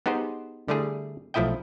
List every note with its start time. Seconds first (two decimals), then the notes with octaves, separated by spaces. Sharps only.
0.06 B3 D#4 G4 G#4 C5
0.68 D3 G3 A3 E4 G#4
1.34 B1 F3 A3 E4 D#5 G5